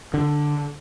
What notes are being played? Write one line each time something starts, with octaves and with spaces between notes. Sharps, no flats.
D3